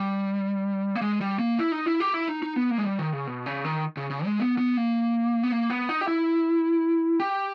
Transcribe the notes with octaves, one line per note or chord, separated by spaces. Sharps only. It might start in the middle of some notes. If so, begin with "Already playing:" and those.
Already playing: G3
A#3
G#3
G3
A#3
E4
D#4
E4
G4
E4
D#4
D#4
B3
A#3
G#3
G3
D#3
C#3
B2
C#3
D#3
C#3
C#3
G#3
B3
B3
A#3
B3
A#3
B3
D#4
G4
E4
G4